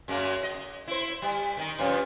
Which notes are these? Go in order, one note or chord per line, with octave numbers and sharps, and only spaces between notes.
F#2 G#3 A#3
D#5
E4 C5
G3
D#3 D#4
G2 F3 C#4